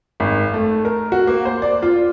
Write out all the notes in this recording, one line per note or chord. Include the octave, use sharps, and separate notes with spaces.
G#1
A3
A#4
F#4
A#3
C5
D5
F4